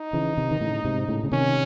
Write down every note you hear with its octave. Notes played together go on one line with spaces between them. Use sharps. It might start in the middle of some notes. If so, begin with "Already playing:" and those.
Already playing: D#4
C#3 E3
C3 D#3
D#3
A2 C#3
G#2 C3
A2 C#3
C#3
C3 D#3 C#4